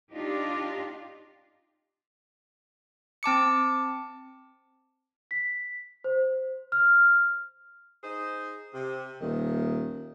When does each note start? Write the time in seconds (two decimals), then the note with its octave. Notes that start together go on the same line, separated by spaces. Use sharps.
0.14 D4 D#4 F4 G4
3.23 C4 A5 D6 C#7
5.31 B6
6.04 C5
6.72 F6
8.03 D#4 G#4 C5
8.74 C3
9.21 D#1 D#3